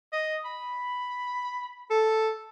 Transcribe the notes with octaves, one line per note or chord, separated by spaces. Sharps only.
D#5
B5
A4